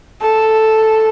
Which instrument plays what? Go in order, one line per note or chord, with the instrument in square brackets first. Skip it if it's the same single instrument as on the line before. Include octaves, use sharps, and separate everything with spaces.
[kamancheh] A4